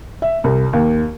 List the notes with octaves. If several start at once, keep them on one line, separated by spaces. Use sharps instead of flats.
E5
C2
D#2